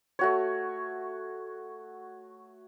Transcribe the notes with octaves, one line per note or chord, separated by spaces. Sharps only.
A3 F#4 C#5